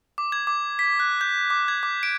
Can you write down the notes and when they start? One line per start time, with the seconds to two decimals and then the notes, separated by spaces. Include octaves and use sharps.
0.18 D6
0.32 G#6
0.47 D6
0.79 B6
1.00 F#6
1.21 G6
1.50 D6
1.68 G#6
1.83 D6
2.03 D7